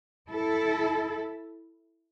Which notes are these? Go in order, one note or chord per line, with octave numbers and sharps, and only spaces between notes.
E4 A4